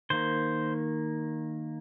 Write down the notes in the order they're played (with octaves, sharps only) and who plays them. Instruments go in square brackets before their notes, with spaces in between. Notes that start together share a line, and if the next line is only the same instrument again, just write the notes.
[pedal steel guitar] D#3 A#3 C5